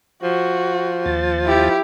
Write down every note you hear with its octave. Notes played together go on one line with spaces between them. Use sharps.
F3 F#4
D#2 A6
E4 G4